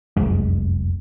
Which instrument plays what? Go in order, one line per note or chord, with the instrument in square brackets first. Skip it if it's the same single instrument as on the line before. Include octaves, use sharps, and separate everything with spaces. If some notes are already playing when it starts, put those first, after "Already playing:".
[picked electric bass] F1 C2 F#2 G#3